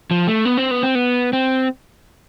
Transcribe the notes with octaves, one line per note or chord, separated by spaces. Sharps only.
F3
A3
B3
C4
B3
C4
B3
C4